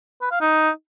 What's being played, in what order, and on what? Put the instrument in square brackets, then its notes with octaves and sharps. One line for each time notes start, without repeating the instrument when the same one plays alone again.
[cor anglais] B4
F5
D#4